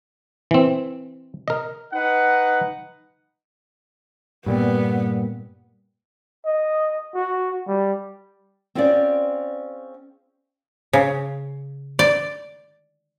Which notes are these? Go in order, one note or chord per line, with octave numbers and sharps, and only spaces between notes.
E3 C4
A#4 D#5
D#4 B4 F#5
G2 A#2 G3 B3
D#5
F#4
G3
C4 C#4 F4 G#4 C5 D5
C#3
D5